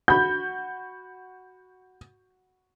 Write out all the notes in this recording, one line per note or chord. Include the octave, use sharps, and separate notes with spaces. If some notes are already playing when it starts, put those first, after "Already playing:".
F#4 B5 G6